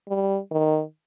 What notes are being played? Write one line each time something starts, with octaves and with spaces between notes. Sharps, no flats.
G3
D#3